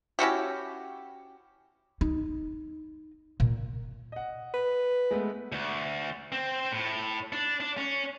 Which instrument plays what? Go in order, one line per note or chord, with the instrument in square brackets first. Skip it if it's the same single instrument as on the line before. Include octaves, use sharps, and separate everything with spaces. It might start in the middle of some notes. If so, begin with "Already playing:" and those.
[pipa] C#4 E4 F#4 G4
[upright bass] D#4
A#2
[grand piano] D#5 F#5
[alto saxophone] B4
[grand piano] G#3 A3 B3
[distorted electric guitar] D2
C4
A2
D4
D4
C#4